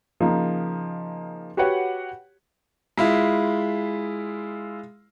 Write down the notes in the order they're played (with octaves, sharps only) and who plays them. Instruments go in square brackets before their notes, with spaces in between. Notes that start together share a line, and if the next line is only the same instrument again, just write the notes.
[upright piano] C#3 F3 A#3 D#4
F#4 G4 B4 C#5 F#5
[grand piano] G#3 E4 F4